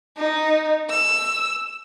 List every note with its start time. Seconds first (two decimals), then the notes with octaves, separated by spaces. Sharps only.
0.17 D#4
0.89 E6